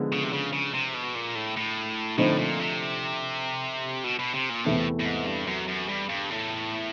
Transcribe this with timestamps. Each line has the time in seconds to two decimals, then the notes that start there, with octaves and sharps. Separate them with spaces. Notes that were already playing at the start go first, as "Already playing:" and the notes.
Already playing: D3 F3 G#3 B3
0.12 C#3
0.24 C3
0.33 C#3
0.53 C#3
0.74 C3
0.94 B2
1.15 A#2
1.35 A2
1.57 A2
2.18 A2 D3 F3 A3 C4 D#4
2.38 A#2
2.59 C3
4.04 B2
4.19 B2
4.34 C3
4.50 A#2
4.65 E2 A2 C3 E3 A3 C4
5.01 A2
5.06 G#2
5.27 G2
5.47 F#2
5.68 F#2
5.89 G2
6.09 G2
6.30 A2